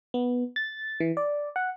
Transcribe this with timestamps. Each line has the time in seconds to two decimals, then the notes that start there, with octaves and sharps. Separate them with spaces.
0.14 B3
0.56 A6
1.00 E3
1.17 D5
1.56 F#5